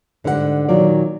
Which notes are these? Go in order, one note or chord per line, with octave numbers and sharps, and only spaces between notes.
G#2 D3 G3 A#4 F#5
A#2 D#3 F#3 F4 D5